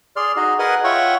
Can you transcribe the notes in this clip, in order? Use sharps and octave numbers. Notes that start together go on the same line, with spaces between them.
G#4 D5 C6 F6
D#4 F#4 G#4 D#5
G#4 A#4 B4 D#5 F#5 G#5
F4 C#5 E5 F#5 G5 C#6